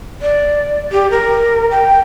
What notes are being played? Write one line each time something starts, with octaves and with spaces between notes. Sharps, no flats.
D5
G4
A#4
G5